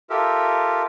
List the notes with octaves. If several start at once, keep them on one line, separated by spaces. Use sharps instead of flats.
F4 G4 A4 A#4 E5